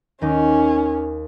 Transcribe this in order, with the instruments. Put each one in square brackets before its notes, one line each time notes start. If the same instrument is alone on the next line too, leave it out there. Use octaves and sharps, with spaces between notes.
[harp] D#2 D#4 D6 [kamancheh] C#4